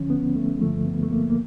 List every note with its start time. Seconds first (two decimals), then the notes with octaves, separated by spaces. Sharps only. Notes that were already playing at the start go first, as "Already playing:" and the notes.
Already playing: D2 D3 F3 C#4
0.10 B3
0.35 A3
0.56 G#3
0.61 G2 D3 F3 A3
0.86 B3
1.03 A3
1.11 A#3
1.30 A#3